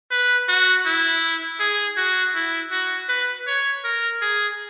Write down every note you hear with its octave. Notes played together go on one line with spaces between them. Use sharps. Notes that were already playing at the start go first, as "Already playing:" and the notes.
B4
F#4
E4
G#4
F#4
E4
F#4
B4
C#5
A#4
G#4